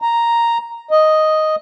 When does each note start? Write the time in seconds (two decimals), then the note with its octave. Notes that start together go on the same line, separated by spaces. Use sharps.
0.02 A#5
0.91 D#5